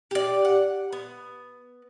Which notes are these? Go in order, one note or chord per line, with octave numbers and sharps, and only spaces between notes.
G4 D5
F#5
B3